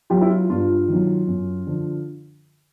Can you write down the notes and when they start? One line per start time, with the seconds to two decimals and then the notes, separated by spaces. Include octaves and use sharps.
0.10 F#3 F4 G4
0.21 E4
0.30 F4
0.50 G2 F4
0.88 D#3 F#3
1.27 F#2
1.67 D3 F3